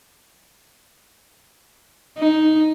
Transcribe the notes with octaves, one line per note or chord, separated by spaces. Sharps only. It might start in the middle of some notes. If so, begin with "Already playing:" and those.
D#4